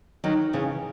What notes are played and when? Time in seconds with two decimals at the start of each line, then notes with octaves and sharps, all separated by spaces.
0.24 D#3 F#3
0.53 C#3 E3